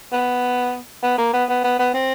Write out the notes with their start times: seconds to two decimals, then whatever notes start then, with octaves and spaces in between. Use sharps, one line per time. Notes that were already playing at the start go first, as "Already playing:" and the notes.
0.13 B3
1.03 B3
1.18 A#3
1.34 B3
1.49 B3
1.64 B3
1.79 B3
1.94 C4